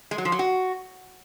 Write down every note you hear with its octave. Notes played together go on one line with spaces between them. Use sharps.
G#3
F#3
F3
F#3
F#4